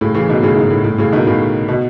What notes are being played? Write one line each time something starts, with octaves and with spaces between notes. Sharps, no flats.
A2 C#3
C#3 E3
B2 D#3
A2 C#3
G#2
A2
A2
A2 C#3
B2 D#3
A2 C#3
B2